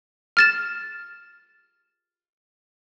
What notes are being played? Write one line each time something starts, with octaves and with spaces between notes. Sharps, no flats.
F6 A6 E7